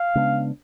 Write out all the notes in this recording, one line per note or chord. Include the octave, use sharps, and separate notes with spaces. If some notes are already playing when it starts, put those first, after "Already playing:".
Already playing: F5
C#3 G#3 B3 D4